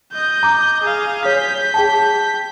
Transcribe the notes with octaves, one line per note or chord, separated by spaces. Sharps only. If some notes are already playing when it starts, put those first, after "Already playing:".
D#5 G6
A#5 D6
G#4 F5
C#5 G6 B6
G#4 G5 A5